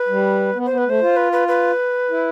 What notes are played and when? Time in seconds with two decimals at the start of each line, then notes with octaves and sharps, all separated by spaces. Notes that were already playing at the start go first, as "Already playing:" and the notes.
Already playing: B4
0.08 G3
0.55 B3
0.66 B3 C5
0.78 B4
0.86 A3 C5
1.02 F4
1.16 B4
1.32 B4
1.48 B4
2.10 E4